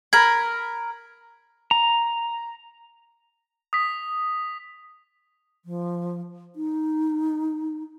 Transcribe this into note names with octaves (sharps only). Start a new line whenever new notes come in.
A#4 B5 G#6
A#5
D#6 B6
F3
D#4